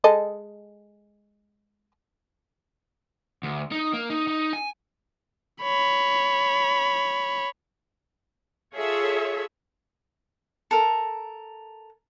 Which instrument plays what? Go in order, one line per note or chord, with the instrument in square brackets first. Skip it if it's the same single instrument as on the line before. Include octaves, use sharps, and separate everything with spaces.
[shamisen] G#3 A4 D#5
[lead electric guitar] D2
D#4
A#3
D#4
D#4
G#5
[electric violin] C#5 B5
[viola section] F4 G#4 A4 C#5 E5
[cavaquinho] A4 A#4